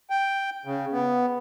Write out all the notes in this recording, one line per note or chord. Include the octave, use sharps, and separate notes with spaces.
G5
C#3
B3